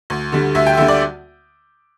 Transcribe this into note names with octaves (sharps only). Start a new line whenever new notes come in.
D2
D3 G3
D2 E5
G5
D3 G3 E5
D5